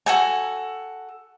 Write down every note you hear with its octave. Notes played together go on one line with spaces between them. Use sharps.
F#4 A4 G#5